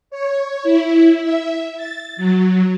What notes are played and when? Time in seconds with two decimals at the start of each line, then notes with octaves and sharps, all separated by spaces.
0.10 C#5
0.63 E4
1.20 E5
1.76 A6
2.17 F#3